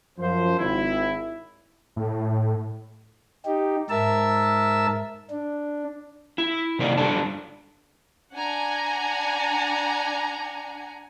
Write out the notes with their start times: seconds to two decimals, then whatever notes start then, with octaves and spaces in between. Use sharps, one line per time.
0.18 F#2 F3 C5
0.58 G#1 E4
1.96 A2
3.45 D#4 G4
3.90 G#2 A#4 E5 A5 E6
5.30 D4
6.38 E4
6.79 C3 D#3 A#3 D#4 D5
6.98 F#3 G3 D4 A4 D5 A5
8.33 D4 F#5 G#5 A#5